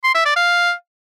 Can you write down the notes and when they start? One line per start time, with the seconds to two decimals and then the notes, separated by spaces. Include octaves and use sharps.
0.04 C6
0.15 E5
0.25 D5
0.36 F5